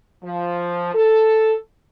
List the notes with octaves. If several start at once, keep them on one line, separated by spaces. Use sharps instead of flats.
F3
A4